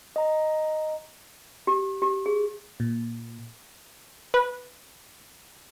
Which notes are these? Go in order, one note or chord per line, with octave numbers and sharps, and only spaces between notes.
D#5 A#5
G4
G4
G#4
A#2
B4